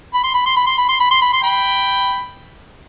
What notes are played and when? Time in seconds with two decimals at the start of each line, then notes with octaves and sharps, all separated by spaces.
0.14 B5
0.24 C6
0.34 B5
0.46 C6
0.56 B5
0.67 C6
0.78 B5
0.89 C6
1.00 B5
1.11 C6
1.22 B5
1.33 C6
1.43 G5 B5